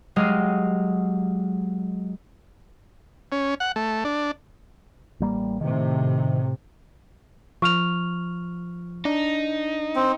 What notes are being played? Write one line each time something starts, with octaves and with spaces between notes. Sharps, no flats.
F#3 G#3 G4 D#5 F5
C#4
F#5
A3
D4
A1 G3 A#3
A2 C3 D#3
F3 C#6 F6 F7
D4 D#4
C4